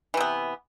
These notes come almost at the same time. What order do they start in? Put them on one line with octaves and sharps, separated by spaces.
E3 C3 B3